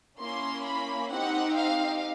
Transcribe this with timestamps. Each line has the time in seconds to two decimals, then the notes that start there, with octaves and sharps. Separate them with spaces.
0.20 A#3 C#4 E4 C6
0.66 B5
1.11 C4 D#4 G4 F#5
1.56 F5